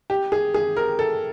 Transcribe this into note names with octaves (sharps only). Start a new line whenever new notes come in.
G4
G#4
G#4
A#4
A4